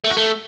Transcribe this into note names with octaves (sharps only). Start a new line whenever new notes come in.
A3
F#4
A3